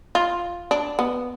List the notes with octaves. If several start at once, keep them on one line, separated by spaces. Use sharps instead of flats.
F4
D4
B3